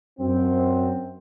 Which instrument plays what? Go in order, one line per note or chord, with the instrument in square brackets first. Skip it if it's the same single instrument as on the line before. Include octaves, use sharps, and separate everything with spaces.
[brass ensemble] F#2 C4